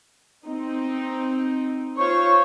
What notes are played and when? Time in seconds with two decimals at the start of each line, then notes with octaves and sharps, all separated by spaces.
0.45 C4 D#4
1.98 F4 C5 C#5 C#6